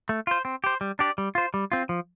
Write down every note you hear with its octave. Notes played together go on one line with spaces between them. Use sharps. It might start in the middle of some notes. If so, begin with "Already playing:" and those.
A3
F4 C5
C4
G4 C5
G3
D4 G4 D5
G3
F4 C5
G3
C4 F4
F3